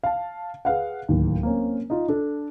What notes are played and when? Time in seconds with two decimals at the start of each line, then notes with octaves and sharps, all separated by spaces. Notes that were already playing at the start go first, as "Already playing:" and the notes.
0.03 F5 A5
0.65 G#4 B4 F5 F#5
1.09 D1 D#2
1.43 A#3 C4 C#4
1.90 D#4 F4
2.08 D4 A4